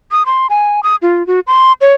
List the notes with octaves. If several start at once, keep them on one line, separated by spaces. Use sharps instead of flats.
D#6
C6
G#5
D#6
F4
F#4
C6
C#5